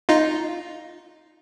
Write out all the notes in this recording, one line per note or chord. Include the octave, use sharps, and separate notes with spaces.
D#4 F4